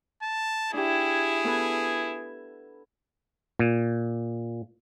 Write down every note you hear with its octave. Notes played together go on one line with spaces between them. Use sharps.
A5
D4 E4 G4 G#4
B3 A4 B4
A#2